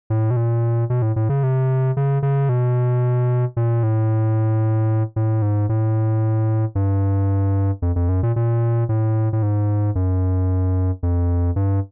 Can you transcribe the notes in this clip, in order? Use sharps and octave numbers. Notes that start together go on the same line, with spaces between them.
A2
B2
A#2
B2
A2
A2
C#3
C3
C#3
C#3
B2
A#2
A2
A2
G#2
A2
G2
F2
F2
F#2
A#2
A#2
A2
A2
G#2
F#2
F2
G2